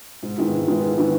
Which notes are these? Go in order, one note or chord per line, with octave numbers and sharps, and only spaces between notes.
G#2
D#3 G#3 B3 E4
G#2
D#3 G#3 B3 E4
G#2
D#3 G#3 B3 E4